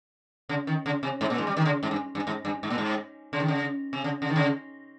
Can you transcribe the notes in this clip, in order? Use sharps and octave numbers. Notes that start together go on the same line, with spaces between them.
C#3
D#3
C#3
C3
G#2
A#2
G#2
G3
D#3
C#3
G#2
G2
G2
G#2
G2
G#2
A#2
G#2
C#3
D#3
C#3
C3
C#3
C#3
D#3
C#3